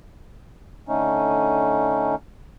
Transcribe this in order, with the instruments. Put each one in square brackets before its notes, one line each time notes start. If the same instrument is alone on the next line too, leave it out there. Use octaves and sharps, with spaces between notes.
[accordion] D3 A3 C#4 D#4